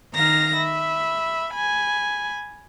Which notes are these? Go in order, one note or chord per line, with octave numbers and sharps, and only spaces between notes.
D#3 F5 A#5 A#6
E5 B5
G#5 B5